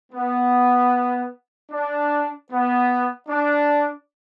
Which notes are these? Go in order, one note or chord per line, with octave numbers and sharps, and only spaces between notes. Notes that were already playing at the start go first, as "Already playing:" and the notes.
B3
D4
B3
D4